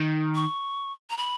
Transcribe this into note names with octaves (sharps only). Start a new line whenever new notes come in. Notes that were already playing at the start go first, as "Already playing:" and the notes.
Already playing: D#3
C#6
A#5
B5